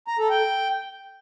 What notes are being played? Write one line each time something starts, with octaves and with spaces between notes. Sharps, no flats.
A#5
A4
G5